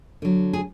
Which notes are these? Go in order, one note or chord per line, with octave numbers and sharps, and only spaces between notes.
D3 F#3
G#4